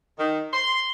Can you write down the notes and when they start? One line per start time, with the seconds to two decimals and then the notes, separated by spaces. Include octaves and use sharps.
0.18 D#3
0.53 C6